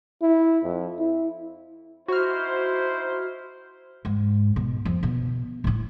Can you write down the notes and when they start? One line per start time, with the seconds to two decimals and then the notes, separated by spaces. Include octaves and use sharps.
0.22 E4
0.64 F2
0.99 E4
2.08 D#4 E4 F#4 C5 F6
4.05 G#2
4.56 B2
4.85 F2
5.03 B2
5.64 A2 E4